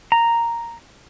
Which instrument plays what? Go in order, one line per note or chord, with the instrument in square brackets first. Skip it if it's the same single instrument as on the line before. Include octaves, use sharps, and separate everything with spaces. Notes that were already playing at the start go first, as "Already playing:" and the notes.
[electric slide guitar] A#5